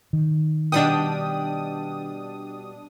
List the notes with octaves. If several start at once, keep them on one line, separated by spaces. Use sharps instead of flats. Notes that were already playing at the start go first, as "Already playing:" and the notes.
D#3
B2 G3 D4 G5 D#6